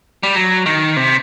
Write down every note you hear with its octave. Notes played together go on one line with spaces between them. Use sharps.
G3
F#3
D#3
C3